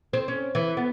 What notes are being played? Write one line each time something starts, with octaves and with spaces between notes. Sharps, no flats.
C4
C#4
E3
B3